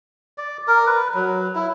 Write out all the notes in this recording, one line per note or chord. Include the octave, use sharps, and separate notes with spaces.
D5
A#4
B4
F#3
E4